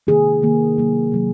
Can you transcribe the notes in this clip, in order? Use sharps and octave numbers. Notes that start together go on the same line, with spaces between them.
C3 D#3 A#3 G#4
C3 D#3 A#3
C3 F#3 A#3
C3 F#3 A#3